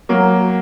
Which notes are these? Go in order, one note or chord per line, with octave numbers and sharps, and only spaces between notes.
F#3 A#3